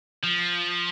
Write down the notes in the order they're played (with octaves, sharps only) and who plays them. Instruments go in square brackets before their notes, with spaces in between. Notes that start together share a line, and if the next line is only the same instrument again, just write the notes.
[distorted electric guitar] F3